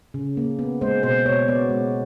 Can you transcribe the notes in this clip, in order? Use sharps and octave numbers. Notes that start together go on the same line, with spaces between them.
C#3
A#3
B3
G#3 C5
B2 C5
B2 C#5
B3 D5
G#3